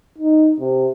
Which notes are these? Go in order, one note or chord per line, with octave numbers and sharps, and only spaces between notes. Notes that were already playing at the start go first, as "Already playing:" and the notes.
D#4
C3